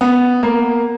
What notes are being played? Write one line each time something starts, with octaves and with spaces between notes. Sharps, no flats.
B3
A#3